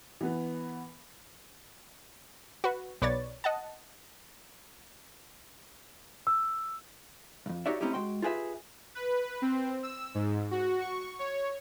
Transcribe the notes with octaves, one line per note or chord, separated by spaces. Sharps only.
E3 B3 B4
F#4 B4
B1 B4 C#5 D5 A6
D#5 F#5 A5
E6
B1 F2
D#4 F#4 G4 C#5 D5 E5
A3 C4 C#4 D#4 E4 G4
G#3 F#4 G5 C6
F4 G4 G#4 B4 E5
B4
C4
E6
G#2
F#4
C#6
C#5